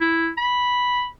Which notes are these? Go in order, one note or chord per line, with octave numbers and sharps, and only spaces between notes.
E4
B5